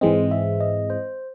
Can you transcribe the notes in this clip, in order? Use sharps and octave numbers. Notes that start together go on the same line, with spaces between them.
G#2 E3 G#3 C4 D#5
E5
D#5
C5